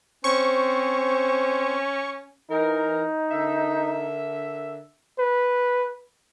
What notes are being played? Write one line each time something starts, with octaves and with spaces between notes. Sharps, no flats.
C4 C#4 C5 C#6
E3 D#4 A#4
D3 A#4 E5
B4